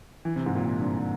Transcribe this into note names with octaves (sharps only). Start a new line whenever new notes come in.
E3
C3
G#2
A#2
A#2
G2